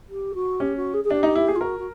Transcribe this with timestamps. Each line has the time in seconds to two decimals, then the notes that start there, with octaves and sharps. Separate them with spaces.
0.09 G4
0.34 F#4
0.60 C#4 G4
0.76 F#4
0.93 G#4
1.04 G#4
1.10 D4 G4
1.23 D#4
1.35 E4
1.48 G#4
1.55 F4
1.61 F#4 A#4
1.79 F#4